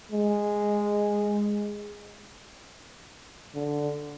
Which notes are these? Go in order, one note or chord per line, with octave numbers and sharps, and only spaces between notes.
G#3
D3